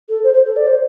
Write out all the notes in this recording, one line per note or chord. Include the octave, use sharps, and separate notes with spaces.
A4
C5
C5
A4
D5
C5